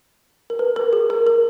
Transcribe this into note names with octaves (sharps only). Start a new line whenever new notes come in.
A#4
B4
A#4
G#4
A#4
A#4